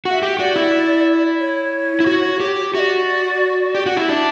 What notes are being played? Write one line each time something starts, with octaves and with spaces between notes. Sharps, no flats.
F#4 F#5
E5
G4
F#4 D5
E4
C#5
E4
F#4
G4
F#4 D5 E5
G4
F#4
E4
D4 E5